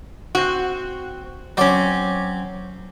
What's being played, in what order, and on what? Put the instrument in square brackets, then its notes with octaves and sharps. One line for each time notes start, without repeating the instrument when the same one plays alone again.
[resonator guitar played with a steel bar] C4 F#4
[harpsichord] F#3 D5 [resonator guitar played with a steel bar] C4 C#4